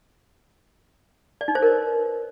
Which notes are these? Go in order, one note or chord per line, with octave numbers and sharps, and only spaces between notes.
D5
D#4
C5
A#4
B4